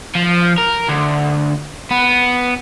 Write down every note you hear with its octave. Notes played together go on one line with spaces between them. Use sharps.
F3
A#4
D2
B3